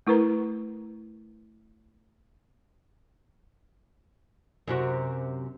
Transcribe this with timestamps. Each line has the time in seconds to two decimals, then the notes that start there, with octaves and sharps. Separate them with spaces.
0.07 A3 E4 A#4 B4 A#5
4.68 F#2 C3 F#4